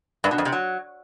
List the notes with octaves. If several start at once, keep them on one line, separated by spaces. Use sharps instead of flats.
G2
B2
F2
C3
F#3